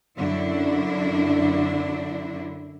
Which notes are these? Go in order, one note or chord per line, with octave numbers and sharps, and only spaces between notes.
F#2 D3 D4 E4